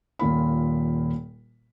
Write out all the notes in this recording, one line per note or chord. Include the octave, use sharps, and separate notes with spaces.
D#1 A#2 F4 B5